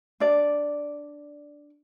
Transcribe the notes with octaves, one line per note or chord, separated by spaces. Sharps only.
D4 D5